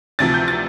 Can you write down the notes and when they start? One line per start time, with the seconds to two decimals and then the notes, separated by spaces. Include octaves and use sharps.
0.19 D2 C3 F3 A6
0.34 G6
0.48 A6